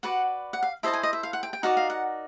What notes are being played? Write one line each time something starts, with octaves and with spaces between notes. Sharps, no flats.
F#4 B4 D5 F#5
F#5
F5
E4 A4 C5 D#5 E5 A5
G#5
D#5
E5
F5
F#5
G5
G5
D#4 F#4 A#4 D5 F#5
F5
F#5